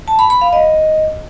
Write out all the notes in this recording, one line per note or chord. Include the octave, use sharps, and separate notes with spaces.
A5
B5
B5
F5
D#5